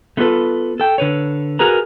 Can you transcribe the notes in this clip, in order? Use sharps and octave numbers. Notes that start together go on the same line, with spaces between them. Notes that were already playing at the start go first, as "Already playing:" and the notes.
A3 B3 F4 F#4 A4 B4
A4 G5
D3 B4 C#5
F#4 G#4 A#4 B4 A#5